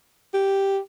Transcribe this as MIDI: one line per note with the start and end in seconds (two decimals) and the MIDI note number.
0.34 0.79 67